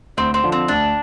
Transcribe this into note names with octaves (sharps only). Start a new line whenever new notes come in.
D2 C4
C4
D3 F3
C4
D2 D4